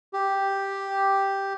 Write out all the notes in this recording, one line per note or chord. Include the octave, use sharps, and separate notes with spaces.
G4